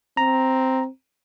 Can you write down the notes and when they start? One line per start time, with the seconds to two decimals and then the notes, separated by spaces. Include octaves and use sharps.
0.17 C4 A#5